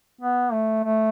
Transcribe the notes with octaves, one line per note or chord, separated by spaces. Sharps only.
B3
A3
A3